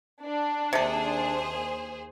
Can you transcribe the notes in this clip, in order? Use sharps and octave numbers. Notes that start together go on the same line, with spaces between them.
D4
D#2 C3 G#4 A4 C5